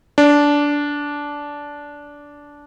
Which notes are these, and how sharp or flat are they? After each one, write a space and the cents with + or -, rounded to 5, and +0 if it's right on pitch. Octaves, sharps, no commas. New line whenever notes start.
D4 -15